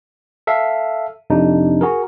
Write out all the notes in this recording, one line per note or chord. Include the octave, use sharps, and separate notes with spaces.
A4 E5 F5
F2 C3 D4 D#4
F#4 G#4 A#4